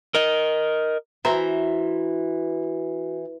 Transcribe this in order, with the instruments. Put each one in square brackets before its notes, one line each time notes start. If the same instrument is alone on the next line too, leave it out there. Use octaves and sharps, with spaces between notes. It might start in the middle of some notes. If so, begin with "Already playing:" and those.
[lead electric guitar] A#4 D#5
[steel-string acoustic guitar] E3 [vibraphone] F#4 [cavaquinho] C5 E5 A#5